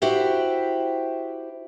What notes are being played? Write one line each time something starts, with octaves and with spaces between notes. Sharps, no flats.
E4 F#4 G4 C5 E5